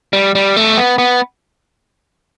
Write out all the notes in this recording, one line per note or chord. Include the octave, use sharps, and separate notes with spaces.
G3
G3
A3
B3
B3